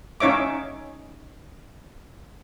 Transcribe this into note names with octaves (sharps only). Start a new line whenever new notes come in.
C#4 D#4 C#5 E5 D6